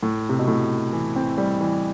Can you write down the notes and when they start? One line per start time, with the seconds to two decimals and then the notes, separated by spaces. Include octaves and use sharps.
0.03 A2
0.29 C3
0.39 B2
0.48 A2
0.93 E3
1.16 C4
1.38 G3
1.61 E3